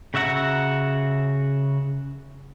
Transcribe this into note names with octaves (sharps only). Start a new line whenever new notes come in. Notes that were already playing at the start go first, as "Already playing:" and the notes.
C#3 F#4 E5 F#5 A#5